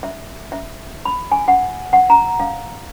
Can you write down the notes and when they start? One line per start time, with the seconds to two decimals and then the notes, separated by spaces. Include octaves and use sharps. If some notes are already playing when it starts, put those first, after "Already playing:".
0.03 E5
0.52 E5
1.05 B5
1.32 G#5
1.48 F#5
1.93 F#5
2.10 A#5
2.40 F5